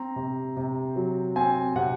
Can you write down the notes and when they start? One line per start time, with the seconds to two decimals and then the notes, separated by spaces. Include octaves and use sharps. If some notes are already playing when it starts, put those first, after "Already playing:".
Already playing: C4 A#5
0.16 C3
0.57 C3
0.96 F#3
1.36 C4 G#5
1.76 C3 F#5